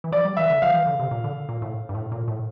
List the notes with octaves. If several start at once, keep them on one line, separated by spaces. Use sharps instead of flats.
E3
F3 D5
G3
E3 E5
D3
F3 F5
E3
D3
C3
A#2
D3
A#2
A2
G2
A2
A#2
A2